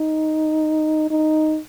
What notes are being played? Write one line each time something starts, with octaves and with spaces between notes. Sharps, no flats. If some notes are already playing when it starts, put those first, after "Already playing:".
Already playing: D#4
D#4